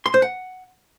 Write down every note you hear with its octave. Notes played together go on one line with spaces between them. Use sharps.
C6
C5
F#5